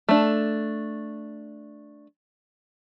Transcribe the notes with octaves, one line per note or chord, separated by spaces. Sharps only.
A3 D4